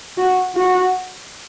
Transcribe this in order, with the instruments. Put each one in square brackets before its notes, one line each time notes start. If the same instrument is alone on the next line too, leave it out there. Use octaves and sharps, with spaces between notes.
[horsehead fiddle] F#4
F#4